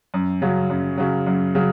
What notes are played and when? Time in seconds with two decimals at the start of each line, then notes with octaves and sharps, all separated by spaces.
0.14 F#2
0.42 C#3 F#3
0.70 F#2
0.98 C#3 F#3
1.27 F#2
1.55 C#3 F#3